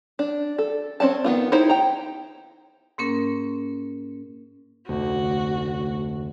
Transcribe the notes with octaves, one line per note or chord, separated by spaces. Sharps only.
D4
A4
C4 C#4 D5 A5
D#3 B3 F4
D#4 E4 G4 G#4 C5
G5 A#5
G#2 A#3 C#4 A#4
F1 D2 F#4